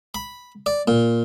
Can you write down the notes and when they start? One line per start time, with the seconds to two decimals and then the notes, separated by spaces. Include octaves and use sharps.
0.15 B5
0.66 D5
0.88 A#2